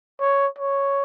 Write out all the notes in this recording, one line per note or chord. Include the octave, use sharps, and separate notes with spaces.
C#5
C#5